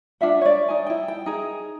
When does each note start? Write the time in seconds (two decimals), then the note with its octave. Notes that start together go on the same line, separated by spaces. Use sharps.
0.21 D4 F4 E5 F#5
0.41 C#5 D5
0.68 D#4 G#5
0.86 E4 G5
1.08 G5
1.26 D#4 G#4